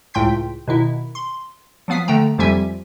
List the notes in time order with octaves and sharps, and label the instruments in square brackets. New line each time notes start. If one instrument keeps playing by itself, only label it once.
[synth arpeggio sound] C#2 A2 G5 C6 G6 B6
B2 D#3 E4
C6
F3 F#3 B3 F5 D#6 B6
D3 A3 G5 A#5
F2 C3 F3 G3 E5 G#5